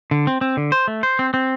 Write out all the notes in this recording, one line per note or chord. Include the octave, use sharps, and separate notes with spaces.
D3
C4
C4
D3
C5
A3
C5
C4
C4